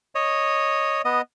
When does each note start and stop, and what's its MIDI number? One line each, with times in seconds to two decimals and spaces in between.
0.15 1.02 73
0.15 1.02 75
1.05 1.21 59
1.05 1.21 75